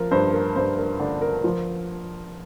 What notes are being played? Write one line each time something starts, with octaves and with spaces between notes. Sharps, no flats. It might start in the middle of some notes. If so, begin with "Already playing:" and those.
Already playing: F3 A#4
G2 C5
A#4
G2 C5
A#4
D3 D4
A#4
F3